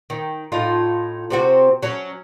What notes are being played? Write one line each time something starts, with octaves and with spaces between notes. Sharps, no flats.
D#3
A2 D#4 F4
C3 C4 F#4
F#3 C#4